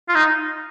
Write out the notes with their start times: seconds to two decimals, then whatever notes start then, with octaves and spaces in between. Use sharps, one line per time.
0.09 F4
0.15 D#4